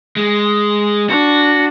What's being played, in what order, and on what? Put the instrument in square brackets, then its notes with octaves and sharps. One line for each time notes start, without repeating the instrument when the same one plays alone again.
[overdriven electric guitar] G#3
[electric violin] D4 [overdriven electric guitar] F#4